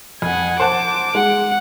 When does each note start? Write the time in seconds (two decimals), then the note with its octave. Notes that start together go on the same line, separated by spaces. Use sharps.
0.22 F2 F#5 G#5
0.60 C5 F#5 A5 D6
1.15 G#3 F#5